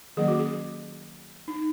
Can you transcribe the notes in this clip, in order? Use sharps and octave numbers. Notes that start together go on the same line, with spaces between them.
D#3 F#3 A#3 C#4 G#4
F#4
G#4
D#4